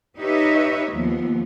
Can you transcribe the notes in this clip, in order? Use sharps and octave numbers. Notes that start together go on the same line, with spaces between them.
D#4 G4 B4 C#5 D#5 E5
D#2 F3 B3